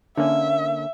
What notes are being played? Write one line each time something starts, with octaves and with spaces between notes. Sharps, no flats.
D3 A#3 C#4 E5